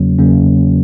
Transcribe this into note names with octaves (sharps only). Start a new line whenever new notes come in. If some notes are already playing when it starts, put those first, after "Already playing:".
Already playing: E2 C#3 F#3 A#3 C#4
E2 C#3 F#3 A#3 C#4